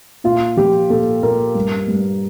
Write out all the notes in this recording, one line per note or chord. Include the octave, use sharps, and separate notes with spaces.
A#2 F4
F3 G4
A#2 A4
A#2 A#4
G2
G2